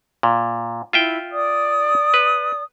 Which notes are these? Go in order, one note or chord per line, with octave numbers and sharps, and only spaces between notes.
A#2
E4 F4 E5 G5
D5 D#6
B4